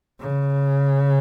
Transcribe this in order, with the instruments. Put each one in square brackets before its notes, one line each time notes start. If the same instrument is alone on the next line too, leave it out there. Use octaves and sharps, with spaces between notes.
[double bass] C#3